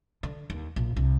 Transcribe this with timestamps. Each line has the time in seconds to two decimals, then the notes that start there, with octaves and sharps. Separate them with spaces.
0.23 D3
0.50 D#2
0.76 A#1
0.96 C2